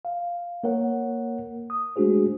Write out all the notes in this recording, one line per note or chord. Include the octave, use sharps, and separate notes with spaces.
F5
A#3 A#4 C#5 F#5
D#6
G#3 A3 D4 F#4 G#4 C5